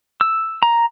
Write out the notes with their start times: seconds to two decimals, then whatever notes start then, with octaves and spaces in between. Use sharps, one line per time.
0.21 E6
0.63 A#5